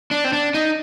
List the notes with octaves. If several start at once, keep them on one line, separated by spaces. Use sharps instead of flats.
D4
C4
D4
D#4